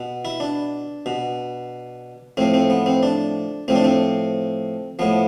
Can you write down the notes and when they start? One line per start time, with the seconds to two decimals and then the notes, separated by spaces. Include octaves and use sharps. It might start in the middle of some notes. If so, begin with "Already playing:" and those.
Already playing: B2
0.25 E4
0.40 D4
1.06 B2
2.37 A2 F3 C4
2.54 C4
2.70 B3
2.86 C4
3.03 D4
3.68 A2 F3 C4
3.76 D4
3.84 C4
4.99 A2 F3 B3